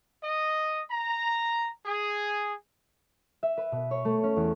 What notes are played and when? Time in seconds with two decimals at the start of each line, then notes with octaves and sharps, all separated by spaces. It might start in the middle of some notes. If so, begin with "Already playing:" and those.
0.24 D#5
0.91 A#5
1.86 G#4
3.43 E5
3.57 B4
3.72 B2
3.91 C#5
4.05 A3
4.23 C#4
4.36 E2